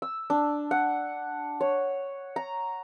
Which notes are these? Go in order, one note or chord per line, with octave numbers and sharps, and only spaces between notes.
E6
D4
F#5
C#5
A#5